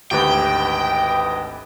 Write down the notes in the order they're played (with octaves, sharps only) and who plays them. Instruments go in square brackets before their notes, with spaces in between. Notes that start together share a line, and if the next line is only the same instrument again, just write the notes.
[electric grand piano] G#1 D2 B4 [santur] G4 [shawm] D#5 [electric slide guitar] G5